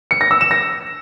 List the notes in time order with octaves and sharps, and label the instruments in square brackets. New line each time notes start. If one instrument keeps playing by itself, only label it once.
[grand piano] C#7
A#6
E6
E7
A#6